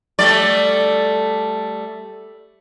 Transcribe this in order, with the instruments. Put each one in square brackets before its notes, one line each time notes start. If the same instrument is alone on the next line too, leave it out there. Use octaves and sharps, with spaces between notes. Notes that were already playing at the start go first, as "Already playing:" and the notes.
[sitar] G3 A3 D5